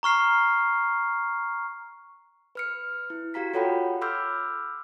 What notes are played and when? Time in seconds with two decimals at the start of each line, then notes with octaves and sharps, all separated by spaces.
0.03 A#5 C#6 F6 C7
2.55 B4 F6 C#7
3.10 E4
3.34 F#4 G4 F5 A#5 B6
3.54 F4 A4 C#5 F#5 G5 B5
4.02 B5 C6 D6 E6 F6 G6